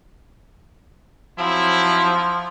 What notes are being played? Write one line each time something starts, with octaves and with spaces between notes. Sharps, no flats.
F3 F#3 C4 E4